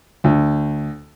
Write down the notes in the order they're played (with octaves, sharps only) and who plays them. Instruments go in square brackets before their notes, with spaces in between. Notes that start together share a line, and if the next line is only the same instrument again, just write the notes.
[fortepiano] D2